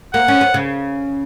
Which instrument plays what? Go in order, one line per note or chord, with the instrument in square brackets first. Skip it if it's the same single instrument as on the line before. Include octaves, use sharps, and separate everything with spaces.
[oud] A#3 [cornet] F#5
[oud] C#4
B3
C#3